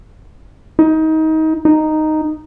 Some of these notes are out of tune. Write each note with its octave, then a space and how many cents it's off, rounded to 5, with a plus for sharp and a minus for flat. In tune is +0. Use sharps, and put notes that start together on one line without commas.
D#4 +25
D#4 -5